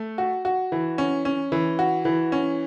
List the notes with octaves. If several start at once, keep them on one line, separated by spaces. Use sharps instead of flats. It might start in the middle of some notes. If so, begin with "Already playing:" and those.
Already playing: A3
F#4
F#4
E3
C#4
C#4
E3
F#4
E3
C#4